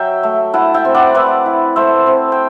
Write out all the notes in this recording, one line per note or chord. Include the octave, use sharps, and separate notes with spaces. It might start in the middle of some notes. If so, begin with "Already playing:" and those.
Already playing: F#3 E5 G5
A3
E4 F#5 A5
E5 G5
C4
D5 F#5
E4 B4 D5
E4
A3 C5 E5
C4
G5